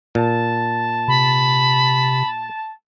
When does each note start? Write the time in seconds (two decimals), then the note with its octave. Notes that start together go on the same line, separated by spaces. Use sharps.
0.15 A#2 A5
1.08 C3 B5